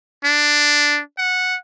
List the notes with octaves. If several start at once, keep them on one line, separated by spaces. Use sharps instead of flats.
D4
F#5